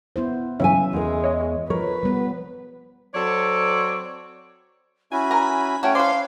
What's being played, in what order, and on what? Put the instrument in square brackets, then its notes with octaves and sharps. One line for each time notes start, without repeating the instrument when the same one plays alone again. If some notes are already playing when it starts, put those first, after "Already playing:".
[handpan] B3 E4 C5
[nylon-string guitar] C#3 G5 G#5 [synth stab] E3 F#3 C#4 [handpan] E5
[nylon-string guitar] E2 A#4 [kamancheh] G#3
[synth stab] C#5 D#5
[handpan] F3 [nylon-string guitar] A#4 [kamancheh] B4 [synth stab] C#5
[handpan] G3 B3
[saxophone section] F#3 C4 A4 C#5 D5
[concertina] C#4 E4 F#4 [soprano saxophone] G#5 [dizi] B5
[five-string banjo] A#4 A#5
[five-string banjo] A3 F#4 [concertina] C#4 C#5 [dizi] G5
[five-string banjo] B4 D5 [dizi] F5 [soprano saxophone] C6